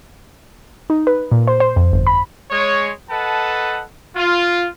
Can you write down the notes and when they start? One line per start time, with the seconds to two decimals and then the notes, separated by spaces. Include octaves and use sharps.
0.90 D#4
1.07 B4
1.31 A#2
1.47 C5
1.60 C5
1.76 F2
1.92 G1
2.07 B5
2.51 G#3 C#5
3.10 A4 B4 D#5 F#5 A5
4.16 F4